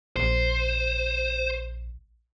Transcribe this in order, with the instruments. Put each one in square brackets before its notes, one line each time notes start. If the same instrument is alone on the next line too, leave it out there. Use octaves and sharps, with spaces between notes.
[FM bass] A#1 [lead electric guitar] C5